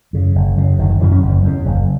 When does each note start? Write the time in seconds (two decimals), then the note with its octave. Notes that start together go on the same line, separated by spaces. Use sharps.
0.13 F#2 C#3
0.35 F#1
0.57 F#2 C#3
0.79 F#1 D#3
0.90 D#3
1.01 F#2 C#3 E3
1.12 C#4
1.23 F#1
1.44 E2 C#3
1.66 F#1